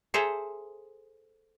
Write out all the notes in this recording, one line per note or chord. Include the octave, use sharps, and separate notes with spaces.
G#4 A4 C5 E5 A#5